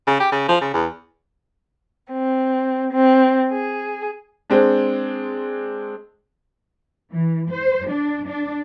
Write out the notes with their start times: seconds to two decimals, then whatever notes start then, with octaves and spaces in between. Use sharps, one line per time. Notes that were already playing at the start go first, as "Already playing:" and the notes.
0.07 C#3
0.20 G4
0.32 C#3
0.49 F3
0.61 C#3
0.74 E2
2.12 C4
2.92 C4
3.51 G#4
4.50 G#3 C4 D4
7.12 E3
7.51 C5
7.88 D4
8.28 D4